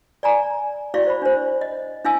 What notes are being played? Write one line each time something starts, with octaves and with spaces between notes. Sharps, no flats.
D5 G#5 A#5
E4 F#4 D5 F5 C#6
C5 B5
D4 C5
D#5
D4 E4 F5 G#5 E6